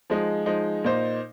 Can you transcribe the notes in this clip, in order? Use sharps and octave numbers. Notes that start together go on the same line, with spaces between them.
F3 G#3 D#4
F3 G#3 D#4
A#2 A#3 D#4 C5